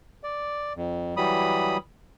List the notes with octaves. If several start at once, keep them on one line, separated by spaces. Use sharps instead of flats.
D5
F2
E3 F#3 G3 B5 D#6